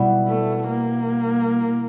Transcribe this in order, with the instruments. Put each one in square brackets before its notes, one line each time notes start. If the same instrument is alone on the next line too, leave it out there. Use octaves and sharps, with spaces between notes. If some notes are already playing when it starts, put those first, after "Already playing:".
Already playing: [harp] B2 G3 B3 E4
[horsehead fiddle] A3
A#3